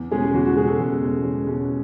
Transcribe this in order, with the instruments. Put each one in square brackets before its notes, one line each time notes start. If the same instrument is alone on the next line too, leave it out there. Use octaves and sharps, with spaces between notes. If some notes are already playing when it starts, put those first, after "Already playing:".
Already playing: [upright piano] E2
B2 G#3 C#4 G#4
E2 F#4
F#4
B2 G#3 C#4 G#4
A4
E2 G#4
B2 G#3 C#4
E2
B2 G#3 C#4